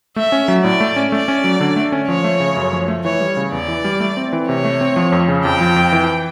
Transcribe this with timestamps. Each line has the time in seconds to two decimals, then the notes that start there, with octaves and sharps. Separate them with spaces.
0.16 A3 E5
0.32 C#4
0.48 F#3
0.64 A2 D5
0.80 A3
0.96 C#4
1.12 A3 D5
1.28 C#4
1.44 F#3
1.60 D3
1.76 A3
1.92 C#4
2.08 F3 C#5
2.24 A3
2.40 C#3
2.56 F#2
2.73 F3
2.88 A3
3.04 E3 C#5
3.20 G3
3.37 C#3
3.52 E2 D5
3.68 E3
3.84 G3
4.00 A3
4.17 C4
4.33 E3
4.48 C3 C#5
4.64 A3
4.81 C4
4.96 F3
5.12 F2
5.28 C#3
5.45 F2 G5
5.61 F3
5.76 F2
5.92 E3